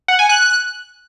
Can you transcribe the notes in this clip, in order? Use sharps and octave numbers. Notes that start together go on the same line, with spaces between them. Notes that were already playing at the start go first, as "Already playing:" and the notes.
F#5
G#5
F#6